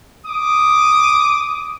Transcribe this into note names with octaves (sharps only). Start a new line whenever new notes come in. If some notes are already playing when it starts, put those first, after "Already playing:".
D6 D#6